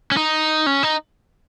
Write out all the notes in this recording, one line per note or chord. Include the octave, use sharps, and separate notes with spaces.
C#4
D#4
C#4
D#4